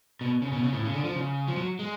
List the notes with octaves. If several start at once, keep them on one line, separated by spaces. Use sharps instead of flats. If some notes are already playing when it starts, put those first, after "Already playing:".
B2
C#3
B2
C#3
A2
C#3
D3
F3
C#3
F3
F#3
G#3